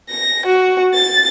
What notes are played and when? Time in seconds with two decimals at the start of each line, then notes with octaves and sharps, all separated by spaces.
0.10 A#6
0.46 F#4
0.94 A6